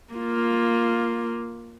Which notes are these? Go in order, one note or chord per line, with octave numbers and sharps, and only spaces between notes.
A#3 F4